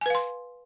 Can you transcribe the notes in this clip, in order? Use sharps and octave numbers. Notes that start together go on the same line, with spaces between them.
B4 F5 G#5 C6